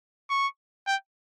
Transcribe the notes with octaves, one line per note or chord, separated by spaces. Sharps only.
C#6
G5